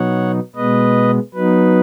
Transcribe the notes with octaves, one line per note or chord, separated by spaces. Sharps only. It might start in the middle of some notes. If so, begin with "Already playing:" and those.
Already playing: B2 F#3 B3 D#4 C#5 F#5
B2 G#3 B3 B4 D#5
F#3 B3 D#4 B4